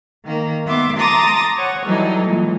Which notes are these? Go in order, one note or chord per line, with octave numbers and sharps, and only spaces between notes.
D#3 A#3
B3 E5 C6 D6
A5 A#5 C6 D6 D#6 A6
C#5 F#5
E3 F#3 G3 D#4 A4
A#2 E3 G#3